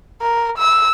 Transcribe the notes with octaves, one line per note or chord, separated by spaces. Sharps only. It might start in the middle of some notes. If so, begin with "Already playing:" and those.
A#4
E6